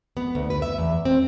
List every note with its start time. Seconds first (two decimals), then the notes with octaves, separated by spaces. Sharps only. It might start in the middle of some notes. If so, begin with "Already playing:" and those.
0.17 B3
0.35 D2
0.50 B4
0.62 E5
0.78 E2
1.05 C4